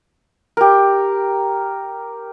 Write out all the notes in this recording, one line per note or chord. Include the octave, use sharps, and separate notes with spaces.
G4 A#4